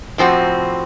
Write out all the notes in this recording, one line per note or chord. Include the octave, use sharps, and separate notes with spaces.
A2 F3 C4 F#4